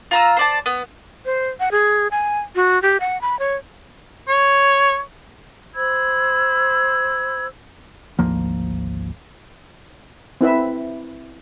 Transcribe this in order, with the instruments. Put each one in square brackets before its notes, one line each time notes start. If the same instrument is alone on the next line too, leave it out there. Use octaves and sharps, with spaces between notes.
[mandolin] F4 A#5 E6
C5 D5 A5
B3
[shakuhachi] C5
F#5
G#4
G#5
F#4
G4
F#5
B5
C#5
[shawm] C#5
[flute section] C5 B5 E6 G#6
[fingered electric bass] G#1 D2 F3 A#3
[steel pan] C4 E4 B4 E5